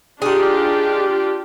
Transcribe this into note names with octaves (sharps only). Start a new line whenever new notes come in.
D4 D#4 F4 G4 G#4